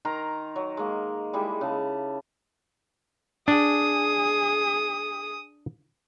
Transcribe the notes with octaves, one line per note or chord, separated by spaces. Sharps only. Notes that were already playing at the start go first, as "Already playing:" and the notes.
D#3 A#4 A#5 C6
F#3
G#3 A#3
G3 G#3 E4 G4
C#3 A5
D4 G#4 D#6